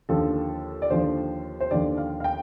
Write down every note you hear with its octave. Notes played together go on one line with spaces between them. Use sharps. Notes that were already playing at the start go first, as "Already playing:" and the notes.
D#2 D3 F3 A4
D5
D#2 D3 F3 C5
C5
D#2 D3 F3 D5
F5
F5
G5